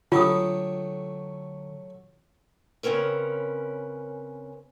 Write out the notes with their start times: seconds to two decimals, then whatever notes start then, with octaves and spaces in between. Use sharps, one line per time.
0.12 D3 F#3 A3 F4 G4 D#6
2.83 C#3 C4 C#4 A#4 B4